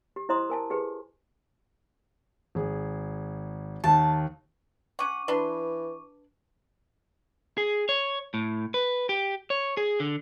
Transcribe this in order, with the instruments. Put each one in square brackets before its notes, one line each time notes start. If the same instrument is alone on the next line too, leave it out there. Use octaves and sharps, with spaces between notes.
[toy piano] G4
E4 C5 D#5 A#5 C6 D#6
A#4 G#5 A5
G4 G#4 B4
[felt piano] G#1 G#4
[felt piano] D#2 D#3 [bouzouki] A5
[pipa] C#4 F#5 [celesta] C#6 D6 D#7
[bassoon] E3 [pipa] D4 B4 C6
[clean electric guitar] G#4
C#5
A2
B4
G4
C#5
G#4
D3